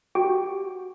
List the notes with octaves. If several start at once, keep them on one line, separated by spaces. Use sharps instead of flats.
F#4 G4 G5